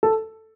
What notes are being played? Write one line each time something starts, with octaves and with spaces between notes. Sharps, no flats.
A4